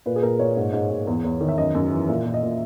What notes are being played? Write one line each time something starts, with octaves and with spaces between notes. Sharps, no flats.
A#2 B4
G#4
A#2 A#4
A#2 C#5
G#2
G#2
G#2
E2
E2
D#3
E5
F#2 D#5
F#2
E3
A#2 E5
A#2
D#5
A#2